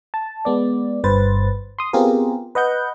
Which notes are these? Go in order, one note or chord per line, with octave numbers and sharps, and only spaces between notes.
A5
G#3 B3 D5
G1 G2 B4 C5 A6
C6 D#6
B3 C4 F4 G4 G#4 A#4
B4 D#5 F#5 G6